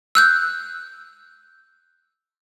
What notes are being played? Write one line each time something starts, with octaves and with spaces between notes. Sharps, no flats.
E6 F#6 G6